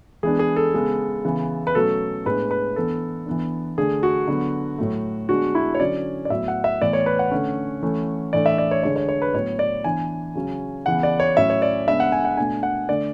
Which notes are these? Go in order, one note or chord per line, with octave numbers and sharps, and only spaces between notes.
E3 G#3 B3 D4 G#4
G#4
A4
C#3 G#3 B3
C#3 E3 B3
B4
B2 F#3 A3 C#4 A4
A2 G#3 B3 D4 B4
B4
E3 B3 D4 A4
E3 B3 D4
D3 A3 D4 G#4
F#4
D3 F#3 B3
A2 F#3 A3
D3 G#3 B3 D4 F#4
E4
C#5
D3 F#3 C#4 D5
D5
A2 F#3 B3 E5
F#5
E5
A2 E3 B3 D5
C#5
B4
F#5
D3 A3 C#4
E3 A3 C#4
A2 E3 A3 D4 D5
E5
D5
C#5
D3 G#3 D4 C#5
C#5
C#5
B4
A2 F#3 B3 C#5
D5
E3 B3 D4 G#5
C#3 F#3 C#4
C#3 E3 B3 F#5
D5
C#5
A2 F#3 C#4 E5
C#5
D5
C#3 G#3 B3 D4 E5
F#5
G#5
F#5
B2 A3 D4 G#5
F#5
D3 A3 D4 D5